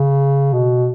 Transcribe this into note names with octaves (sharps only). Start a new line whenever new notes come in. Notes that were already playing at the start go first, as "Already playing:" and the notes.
Already playing: C#3
B2